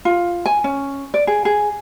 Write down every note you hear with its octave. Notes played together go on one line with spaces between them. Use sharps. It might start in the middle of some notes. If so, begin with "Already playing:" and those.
F4
G#5
C#4
D5
G#4
G#4